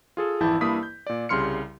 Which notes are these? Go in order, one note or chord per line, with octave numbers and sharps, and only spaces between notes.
F4 G#4 A4
G#1 F2 E3 E4 A5 G6
G2 A#3 E4 A5 D#6 B6
G6
A#2 D5
C2 C#3 G3 C6 F6 C#7